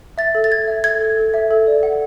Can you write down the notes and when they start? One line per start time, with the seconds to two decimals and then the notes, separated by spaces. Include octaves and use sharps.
0.18 E5 A6
0.35 A4
0.44 A6
0.51 A4 G#6
0.68 E5
0.84 A4 G#6
1.01 A4
1.17 A4
1.34 E5
1.51 A4
1.67 D5
1.83 F#5